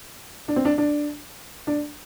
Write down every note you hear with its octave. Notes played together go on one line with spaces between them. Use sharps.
D4
C4
D4
D4
D4